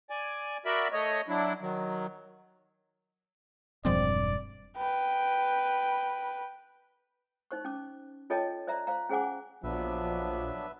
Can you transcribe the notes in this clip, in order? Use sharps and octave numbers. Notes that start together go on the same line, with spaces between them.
D5 G#5
F#4 A#4 D5 E5 B5
A3 C#5 D#5
F#3 D4 E4
D#3 F#3
E1 G2 F3 G#3 C4 D5
B4 G5
D#4 C5 C#6
C#4 D6
F4 A4 C#5 D#5 G5 A5
C5 D5 E5 A#5
C5 F5 A#5
C#4 G#4 C5 F#5 G#5 D6
A#1 F3 F#3 B3 D4 B4 E5